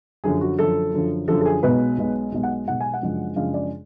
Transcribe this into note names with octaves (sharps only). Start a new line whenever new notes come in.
F#2 D3 F3 G#4
F#4
F#2 D3 F3 A4
F#2 D3 F3
F#2 D3 F3 A4
A4
G#4
B1 B2 G#3 B4
B1 B2 G#3
B1 B2 G#3
F#5
B1 B2 G#3 F#5
G#5
F#5
F#2 C#3 F3 G#3 D4
F#2 C#3 F3 G#3 D4 F5
D5